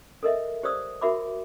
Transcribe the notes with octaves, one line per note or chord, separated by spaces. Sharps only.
A4 A#4 D#5 E5
G4 C5 D5 D#6 E6
F#4 A#4 E5 B5 D6